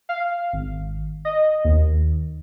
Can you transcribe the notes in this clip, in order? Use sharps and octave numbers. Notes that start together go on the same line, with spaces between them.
F5
G#1
D#5
D#2